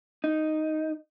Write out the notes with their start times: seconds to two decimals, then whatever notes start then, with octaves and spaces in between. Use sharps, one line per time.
0.24 D#4